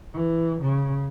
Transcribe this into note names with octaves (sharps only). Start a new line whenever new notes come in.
E3
C#3